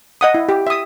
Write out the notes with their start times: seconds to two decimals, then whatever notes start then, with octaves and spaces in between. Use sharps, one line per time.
0.21 D#5 F#5 D#6
0.34 E4
0.49 G4
0.67 E5 D#6